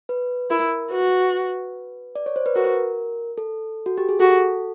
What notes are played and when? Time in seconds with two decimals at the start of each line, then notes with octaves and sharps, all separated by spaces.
0.09 B4
0.50 E4 A#4
0.91 F#4 B4
2.15 D5
2.26 C#5
2.36 C5
2.46 B4
2.55 F#4 A#4
3.38 A4
3.86 F#4
3.98 G4
4.09 G#4
4.19 F#4 A4